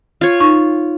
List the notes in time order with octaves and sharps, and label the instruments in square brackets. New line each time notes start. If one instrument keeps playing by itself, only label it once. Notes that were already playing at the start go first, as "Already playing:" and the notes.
[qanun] F4 C#5
[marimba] D#4 C#6